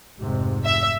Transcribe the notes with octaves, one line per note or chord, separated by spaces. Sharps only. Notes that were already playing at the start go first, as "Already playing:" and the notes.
F1 G#2 C3
E5